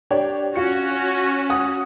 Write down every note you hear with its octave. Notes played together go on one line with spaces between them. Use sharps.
D4 G4 C#5
C#4 F4 F#4 C#7
F#5 D#6